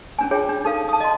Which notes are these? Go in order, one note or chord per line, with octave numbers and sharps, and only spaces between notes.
C#4 D4 G#5
F4 G#4 C#5 E5 G5
D4
D#4 A4 F5
A5 D#6
D#5 C6